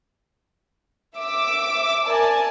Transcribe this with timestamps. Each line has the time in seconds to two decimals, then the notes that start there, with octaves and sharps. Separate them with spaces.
1.17 E5 D6 E6
2.05 A#4 D5 G#5 A5